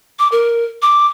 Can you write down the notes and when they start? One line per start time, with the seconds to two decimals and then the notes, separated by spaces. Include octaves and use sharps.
0.19 D6
0.32 A#4
0.82 D6